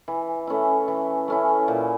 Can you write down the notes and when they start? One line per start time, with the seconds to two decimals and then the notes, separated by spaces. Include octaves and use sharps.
0.08 E3
0.47 A3 C#4 E4
0.88 E3
1.28 A3 C#4 E4
1.68 A#2